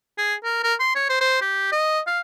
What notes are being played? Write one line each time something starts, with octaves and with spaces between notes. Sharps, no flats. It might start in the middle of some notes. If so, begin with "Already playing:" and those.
G#4
A#4
A#4
C6
C#5
C5
C5
G4
D#5
F5